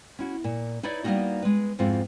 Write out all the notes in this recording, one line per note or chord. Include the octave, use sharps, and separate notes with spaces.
C#4 E4 F#4
A#2
D#4 E4 B4 C#5 D5 E5
G3 A#3 B3 C#4 D#4 F#4
G#3 B4
F2 G#2 C4 E4 F4